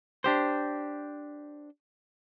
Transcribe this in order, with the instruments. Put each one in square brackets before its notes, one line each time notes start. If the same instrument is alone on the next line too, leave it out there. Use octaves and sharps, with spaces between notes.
[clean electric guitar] D4 G4 C5